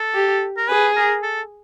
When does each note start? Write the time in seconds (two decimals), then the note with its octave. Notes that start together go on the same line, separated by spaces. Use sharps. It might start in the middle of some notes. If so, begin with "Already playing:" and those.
Already playing: A4
0.14 G4
0.57 A#4
0.69 G#4 B4
0.96 A#4
1.22 A4